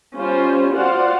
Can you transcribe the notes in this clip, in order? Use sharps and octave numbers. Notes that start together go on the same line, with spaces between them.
G3 C#4 F4 C5
F4 F#4 C5 D5 F5 F#5